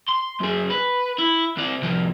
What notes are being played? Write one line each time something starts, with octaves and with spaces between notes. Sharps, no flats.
C6
F#2 G#4
B4
E4
C3 D5
C2 F3